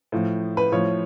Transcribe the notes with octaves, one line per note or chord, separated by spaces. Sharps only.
A2 F3
B4
A2 F3 C#5